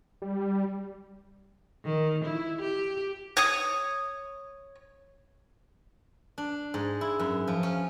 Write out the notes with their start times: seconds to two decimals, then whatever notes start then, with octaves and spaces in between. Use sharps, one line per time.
0.22 G3
1.85 D#3
2.25 E4
2.61 G4
3.37 C#5 D#6
6.38 D4
6.74 G#2
7.01 E4
7.19 F#2
7.48 F3
7.63 C#4